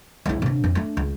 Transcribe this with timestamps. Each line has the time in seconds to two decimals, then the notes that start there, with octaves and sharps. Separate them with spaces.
0.26 C#2 E4
0.42 C3 D4
0.64 F2
0.75 A3 D4
0.97 C#2